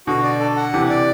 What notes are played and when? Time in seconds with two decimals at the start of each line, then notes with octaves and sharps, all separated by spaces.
0.07 B2 D3 F#4
0.23 D5
0.40 A4
0.57 F#5
0.74 C3 E3 G4
0.90 D5